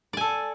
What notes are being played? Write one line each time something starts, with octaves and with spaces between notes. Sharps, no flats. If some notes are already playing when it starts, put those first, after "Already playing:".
A4 D5 G#5